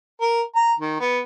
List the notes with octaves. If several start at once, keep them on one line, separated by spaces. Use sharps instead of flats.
A#4
A#5
D#3
B3